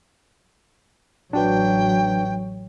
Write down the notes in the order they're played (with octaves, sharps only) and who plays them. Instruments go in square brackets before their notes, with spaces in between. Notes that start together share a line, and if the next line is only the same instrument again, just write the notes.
[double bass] A1 F#3 [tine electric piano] D4 F#4 B4 [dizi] G5